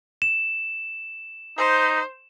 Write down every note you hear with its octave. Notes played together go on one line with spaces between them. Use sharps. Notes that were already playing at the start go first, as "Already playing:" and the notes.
E7
D#4 C5